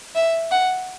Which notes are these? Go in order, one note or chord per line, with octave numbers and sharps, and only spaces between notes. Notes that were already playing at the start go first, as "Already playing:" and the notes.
E5
F#5